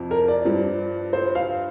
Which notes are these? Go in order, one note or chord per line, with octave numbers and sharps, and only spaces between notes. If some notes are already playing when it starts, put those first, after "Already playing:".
Already playing: F2 C3 F3
A#4
D5
G2 F3
C5
F5